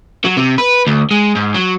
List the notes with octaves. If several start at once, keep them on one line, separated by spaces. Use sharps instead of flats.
F#3
C3
B4
D2
G#3
G#2
F#3